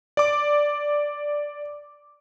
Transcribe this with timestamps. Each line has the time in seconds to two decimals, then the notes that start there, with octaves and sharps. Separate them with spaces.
0.17 D5 D6